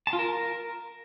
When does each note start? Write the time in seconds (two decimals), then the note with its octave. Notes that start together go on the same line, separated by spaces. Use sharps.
0.07 A5
0.13 F4
0.19 A#4